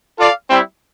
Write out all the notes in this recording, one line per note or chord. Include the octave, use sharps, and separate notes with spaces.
F4 A4 D5 F5
G3 C4 E4